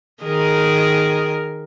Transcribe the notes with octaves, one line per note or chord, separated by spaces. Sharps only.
D#3 G#4 A#4